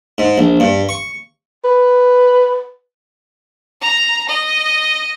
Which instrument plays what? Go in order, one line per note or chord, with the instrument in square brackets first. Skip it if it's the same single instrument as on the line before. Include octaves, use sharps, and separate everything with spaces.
[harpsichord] G#2
A#1
G2
C#6
[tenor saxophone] B4
[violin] A#5
D#5